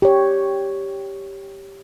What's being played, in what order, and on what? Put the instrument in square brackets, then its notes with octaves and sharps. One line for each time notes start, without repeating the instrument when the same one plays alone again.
[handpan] G4 C#5